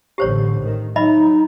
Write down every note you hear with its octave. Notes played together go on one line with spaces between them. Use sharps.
A1 D3 G4 C5 C#5
A2 D#3
F#3 D#4 D#5 E5 B5